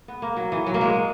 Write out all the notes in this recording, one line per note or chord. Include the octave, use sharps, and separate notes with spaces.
B3
A#3
F#3
E3
F#3
A#3
G#3